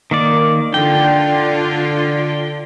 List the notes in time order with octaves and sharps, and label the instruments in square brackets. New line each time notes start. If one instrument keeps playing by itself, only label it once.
[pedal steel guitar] D#3 A#3 D5
[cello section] D3 D4 F4 [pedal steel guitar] G5